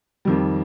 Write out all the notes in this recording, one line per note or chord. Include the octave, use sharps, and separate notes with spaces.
F2 D#3 G3